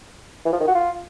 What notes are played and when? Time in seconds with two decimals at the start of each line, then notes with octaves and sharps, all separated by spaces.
0.45 E3
0.53 F3
0.60 D#3
0.67 F#4
0.75 F4